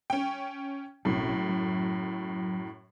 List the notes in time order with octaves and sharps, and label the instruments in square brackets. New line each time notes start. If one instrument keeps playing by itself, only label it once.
[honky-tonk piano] C#4 G5
[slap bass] B1 C4 [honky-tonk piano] F#2 A2
[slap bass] F#3